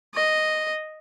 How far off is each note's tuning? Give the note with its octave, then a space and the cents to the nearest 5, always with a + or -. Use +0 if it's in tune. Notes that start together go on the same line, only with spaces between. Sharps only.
D#5 -5